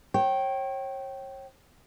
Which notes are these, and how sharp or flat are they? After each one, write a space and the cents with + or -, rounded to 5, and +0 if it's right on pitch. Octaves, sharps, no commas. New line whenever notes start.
C#5 -35 G5 -20